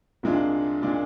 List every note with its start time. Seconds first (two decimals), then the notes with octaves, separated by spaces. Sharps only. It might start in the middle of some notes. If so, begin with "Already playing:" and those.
0.23 C2 A#2 G#3 D4 F4
0.82 A#2 G#3 D4 F4